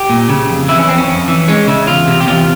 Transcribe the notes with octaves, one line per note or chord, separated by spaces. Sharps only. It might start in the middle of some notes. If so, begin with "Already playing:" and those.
Already playing: G4
A#2
C#3
F2
E3 E4
C#4
F2 C4
C#4
F2
E3
G#3 C#4
C#3 E4
E2 F4
C3
G4
E2 F4